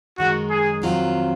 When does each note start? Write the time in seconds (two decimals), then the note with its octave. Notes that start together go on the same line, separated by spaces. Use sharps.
0.18 F#2 D#3 G#3 F#4
0.50 G#4
0.82 F2 D#3 F#3 C4 F4